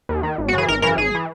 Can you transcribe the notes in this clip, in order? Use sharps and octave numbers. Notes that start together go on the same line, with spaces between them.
D#2
D#3
G#1
F#4
F#2 C#3 E3 G#4
G#1 A#4
F#2 C#3 E3 A#4
G#1 G#4
E3